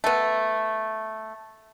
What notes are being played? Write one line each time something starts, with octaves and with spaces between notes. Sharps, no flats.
A3 B3